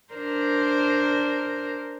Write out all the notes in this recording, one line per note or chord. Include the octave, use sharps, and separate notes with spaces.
D4 A#4 C5